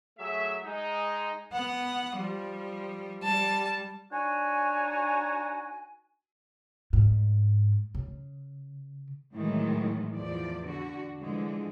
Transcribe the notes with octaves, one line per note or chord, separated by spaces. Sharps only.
F#3 A3 G#4 E5
G#3 D#4
B3 F#5
F3 G3
G3 A5
D4 D#4 F#4 C#5 G#5
G#2
C#3
A2 D#3 E3 F#3 G#3
E2 F3 D5
D3 F#4
D3 E3 F3 G#3